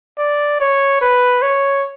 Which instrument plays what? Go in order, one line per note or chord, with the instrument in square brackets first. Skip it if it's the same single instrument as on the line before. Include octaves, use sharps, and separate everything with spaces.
[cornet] D5
C#5
B4
C#5